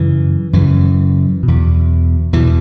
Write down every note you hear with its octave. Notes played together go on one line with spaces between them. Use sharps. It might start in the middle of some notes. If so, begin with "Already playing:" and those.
Already playing: F#2 C#3 E3
F#2 C#3 E3
E2 B2
E2 B2 E3